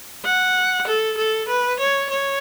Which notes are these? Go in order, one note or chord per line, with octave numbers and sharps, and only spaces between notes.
F#5
A4
A4
B4
C#5
C#5